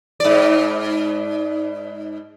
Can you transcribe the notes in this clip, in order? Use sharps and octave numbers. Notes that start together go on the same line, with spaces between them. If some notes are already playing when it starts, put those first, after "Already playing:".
G#2 D5